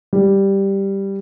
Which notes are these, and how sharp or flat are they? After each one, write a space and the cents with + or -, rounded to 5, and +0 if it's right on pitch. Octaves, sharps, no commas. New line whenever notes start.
G3 +0